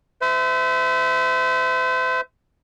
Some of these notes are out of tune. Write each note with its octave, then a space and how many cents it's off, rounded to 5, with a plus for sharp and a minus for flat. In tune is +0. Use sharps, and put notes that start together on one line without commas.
C5 -40 E5 -5